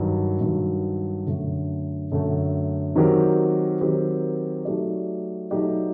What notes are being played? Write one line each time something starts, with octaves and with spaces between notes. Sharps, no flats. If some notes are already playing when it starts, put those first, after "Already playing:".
Already playing: G2 D#3 F#3
G2 D#3 F#3
F#2 D3 A3
F#2 D3 A3
D#3 F#3 C4 G4 A#4
D#3 F#3 C4 G4 A#4
F#3 A3 D#4 G4 D5
F#3 A3 D#4 G4 D5